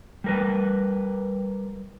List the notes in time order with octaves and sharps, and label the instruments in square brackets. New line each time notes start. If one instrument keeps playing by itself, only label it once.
[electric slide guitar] G3 A#4 B4